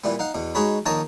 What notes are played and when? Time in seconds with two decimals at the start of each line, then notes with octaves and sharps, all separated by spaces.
0.04 A#2 E3 G3 B3
0.19 D#4 F5 F#5
0.34 E2 B2
0.55 G#3 D#4 F#4 G#4 C#5 B5
0.86 A#1 D#3 C#5 A5 A#5 D#6